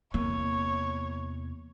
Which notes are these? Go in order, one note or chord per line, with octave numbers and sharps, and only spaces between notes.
E2 C3 E3 A#3 C#5